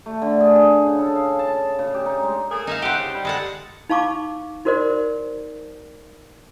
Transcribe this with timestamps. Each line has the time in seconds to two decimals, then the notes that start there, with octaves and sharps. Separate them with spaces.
0.06 A3
0.22 D3
0.40 G#4
0.56 G#4
0.86 C#3
0.99 A4
1.15 F5
1.39 A5
1.79 C#3
1.94 G4
2.06 D#4
2.23 G#3
2.50 A3 A#3 G#4
2.67 D#4 E5 F5
2.82 E4 G4 C5 F#5
2.97 C#3
3.14 G3
3.25 G#3 A4 F#5
3.90 D#4 F5 A5 C#6 D6
4.65 D#4 F#4 A#4 C5 D5